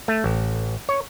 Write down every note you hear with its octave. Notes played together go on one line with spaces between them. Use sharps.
A3
A1
C#5